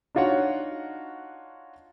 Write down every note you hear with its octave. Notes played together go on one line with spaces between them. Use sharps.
D4 D#4 F4 F#4 C#5 F#5